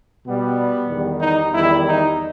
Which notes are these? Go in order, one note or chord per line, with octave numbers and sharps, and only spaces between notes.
B2 G3 B3
E2 D#3 G3
D#4
E2 D#3 G3 E4
D#4